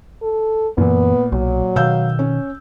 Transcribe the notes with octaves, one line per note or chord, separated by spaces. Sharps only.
A4
F#2 A#2 E3 B3
B1 F#3
B2 D#3 F5 E6 G6
C#4